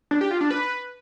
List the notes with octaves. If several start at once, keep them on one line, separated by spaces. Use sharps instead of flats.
D4
G4
F4
D4
B4